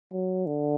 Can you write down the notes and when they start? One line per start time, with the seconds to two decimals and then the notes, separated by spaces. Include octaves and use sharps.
0.12 F#3
0.46 D3